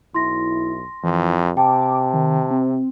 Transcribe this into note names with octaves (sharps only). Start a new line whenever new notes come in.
B1 E4 C6 A#6
F2 E3
C3 G5 A5 D6
D#3
C4